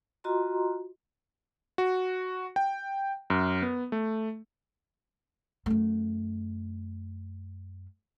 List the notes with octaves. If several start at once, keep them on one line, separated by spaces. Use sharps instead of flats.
F4 F#4 D#5 A#5 C6
F#4
G5
F#2
B3
A3
F#2 A3